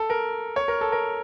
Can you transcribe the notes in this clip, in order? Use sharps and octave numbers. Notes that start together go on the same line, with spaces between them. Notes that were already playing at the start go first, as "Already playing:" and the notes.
Already playing: A4
A#4
C#5
A#4
A4
A#4